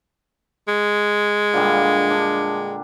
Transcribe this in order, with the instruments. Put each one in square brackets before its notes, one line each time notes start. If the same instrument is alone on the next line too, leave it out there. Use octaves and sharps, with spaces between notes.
[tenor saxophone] G#3
[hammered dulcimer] A#2 D3 G3
D4